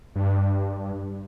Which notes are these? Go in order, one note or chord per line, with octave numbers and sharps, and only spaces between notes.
G2